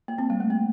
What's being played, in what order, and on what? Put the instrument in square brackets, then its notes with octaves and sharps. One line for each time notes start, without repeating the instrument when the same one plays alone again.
[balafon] A#3
C4
G3
A3
A#3